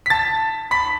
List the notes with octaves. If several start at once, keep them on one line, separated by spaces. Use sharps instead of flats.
B6
A5 A6
B5 B6